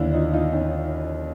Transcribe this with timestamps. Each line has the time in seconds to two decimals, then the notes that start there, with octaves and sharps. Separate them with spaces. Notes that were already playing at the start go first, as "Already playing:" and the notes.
Already playing: D#2 D3 D4 E4
0.13 D#4 F4
0.33 D#4 F4
0.53 C#4 D#4